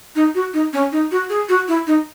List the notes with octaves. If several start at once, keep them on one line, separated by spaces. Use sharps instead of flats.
D#4
F#4
D#4
C#4
D#4
F#4
G#4
F#4
E4
D#4